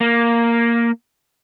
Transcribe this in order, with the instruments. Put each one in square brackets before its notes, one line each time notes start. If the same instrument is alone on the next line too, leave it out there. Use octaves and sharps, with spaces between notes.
[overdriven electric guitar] A#3